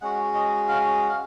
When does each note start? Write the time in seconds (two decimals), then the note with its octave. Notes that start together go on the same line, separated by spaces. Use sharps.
0.01 G#3 C#4 F#4 F#5
0.34 D#5
0.68 F5
1.02 F#5
1.09 F5